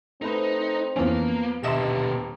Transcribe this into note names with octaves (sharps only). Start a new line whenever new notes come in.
A3 C4 D#4 B4 C5
F2 E3 F3 A#3 B3 C#4
D#1 B2 D3 G4 D#5 E5 C6 E7